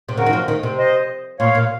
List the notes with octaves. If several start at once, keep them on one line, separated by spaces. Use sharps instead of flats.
C3
C#3 F#4 A#4
D#3
F3
D#3
C3
C5 D#5
A#2 C#5 F5
A#2